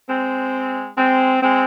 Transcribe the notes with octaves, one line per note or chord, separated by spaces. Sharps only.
G#3 C4
G#3 C4
G#3 C4